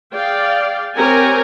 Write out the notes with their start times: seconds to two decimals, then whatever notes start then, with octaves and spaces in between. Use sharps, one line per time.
0.13 G#4 D5 F5 G5
0.96 C4 G4 A#4 C#5 G#5 A#5